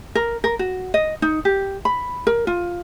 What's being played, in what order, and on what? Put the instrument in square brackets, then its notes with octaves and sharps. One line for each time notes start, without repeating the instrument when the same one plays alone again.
[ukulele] A#4
A#4
F#4
D#5
D#4
G4
B5
A#4
F4